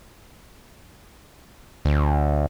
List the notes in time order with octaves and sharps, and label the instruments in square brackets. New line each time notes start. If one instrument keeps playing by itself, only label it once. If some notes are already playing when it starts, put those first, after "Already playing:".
[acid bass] D2